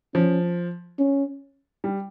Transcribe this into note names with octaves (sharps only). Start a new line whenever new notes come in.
F3 C#4
C#4
G3